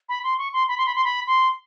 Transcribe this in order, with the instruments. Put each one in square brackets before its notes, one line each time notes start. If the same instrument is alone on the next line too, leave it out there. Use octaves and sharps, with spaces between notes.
[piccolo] B5
C6
C#6
C6
B5
C6
B5
C6
B5
C6